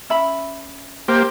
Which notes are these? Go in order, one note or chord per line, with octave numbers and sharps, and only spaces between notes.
C#4 E5 B5
A#3 G4 C5